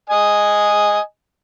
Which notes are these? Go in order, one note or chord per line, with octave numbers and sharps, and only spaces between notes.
D#5 G#5